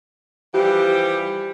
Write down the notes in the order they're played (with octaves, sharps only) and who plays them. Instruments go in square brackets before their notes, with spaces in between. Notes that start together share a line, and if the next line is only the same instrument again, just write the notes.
[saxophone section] E3 F3 G3 G4